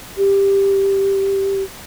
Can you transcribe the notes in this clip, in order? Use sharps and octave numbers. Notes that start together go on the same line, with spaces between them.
G4